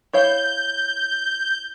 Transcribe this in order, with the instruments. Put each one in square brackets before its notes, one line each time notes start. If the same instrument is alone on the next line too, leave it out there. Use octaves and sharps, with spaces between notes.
[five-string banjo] E4 C#5 F5 [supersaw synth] G6